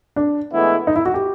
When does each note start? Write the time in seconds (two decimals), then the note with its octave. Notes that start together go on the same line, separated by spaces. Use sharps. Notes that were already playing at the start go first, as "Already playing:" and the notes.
0.16 D4
0.51 A2 E3 G#3 B3 E4
0.87 D#4
0.96 E4
1.06 F#4
1.14 G4